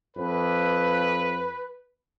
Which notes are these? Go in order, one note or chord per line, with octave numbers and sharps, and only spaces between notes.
F2 B4